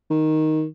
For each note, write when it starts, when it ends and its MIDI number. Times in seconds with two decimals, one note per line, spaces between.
0.10 0.65 51